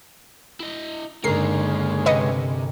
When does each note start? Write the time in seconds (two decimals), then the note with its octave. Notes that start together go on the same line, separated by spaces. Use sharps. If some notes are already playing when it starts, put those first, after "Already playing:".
0.60 E4 D#5
1.24 G1 C#3 G#3 A#3 D#4 A#4 C7
2.06 C3 B4 D#5 C#7